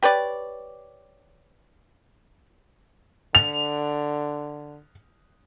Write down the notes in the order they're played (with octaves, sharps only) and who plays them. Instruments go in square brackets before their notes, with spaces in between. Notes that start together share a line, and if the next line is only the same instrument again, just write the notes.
[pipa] G4 B4 C#5 D5
[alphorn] D3 [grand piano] F7